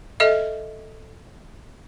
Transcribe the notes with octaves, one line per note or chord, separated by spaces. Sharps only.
A4 D#5 E5